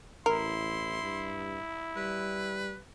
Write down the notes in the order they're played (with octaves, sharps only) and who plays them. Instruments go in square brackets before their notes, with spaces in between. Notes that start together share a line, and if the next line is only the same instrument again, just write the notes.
[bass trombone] A1 [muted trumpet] E4 [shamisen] A#4 [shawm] C6
[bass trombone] G2
[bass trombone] G3 [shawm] B4